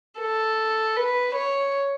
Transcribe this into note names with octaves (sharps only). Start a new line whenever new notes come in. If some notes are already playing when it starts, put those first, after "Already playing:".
A4
B4
C#5